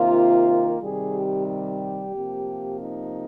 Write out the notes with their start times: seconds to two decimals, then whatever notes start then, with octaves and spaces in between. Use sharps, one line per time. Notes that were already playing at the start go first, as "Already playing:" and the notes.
Already playing: C3 D#3 A#3 F4
0.79 C3 D#3 G3 G#4
1.13 G4
1.45 G4
2.12 C3 F3 A#3
2.80 D#4